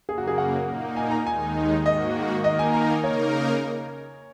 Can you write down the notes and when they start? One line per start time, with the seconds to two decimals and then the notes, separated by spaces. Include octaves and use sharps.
0.08 F#2 C#3 A#3 G#4
0.18 F#4
0.27 G#4
0.38 F#5
0.67 A#2 A#3 D#4
0.97 G#5
1.11 A#5
1.27 D#2 D#3 G#3 D#4 G#5
1.85 G#2 D#3 A#3 F#4 D#5
2.44 D#3 A#3 D#4 A#4 D#5
2.59 G#5
2.74 A#5
2.84 A#5
2.89 G#5
3.04 C#3 A#3 D#4 A#4 C#5